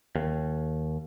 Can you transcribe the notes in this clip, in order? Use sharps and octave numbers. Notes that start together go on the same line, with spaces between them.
D#2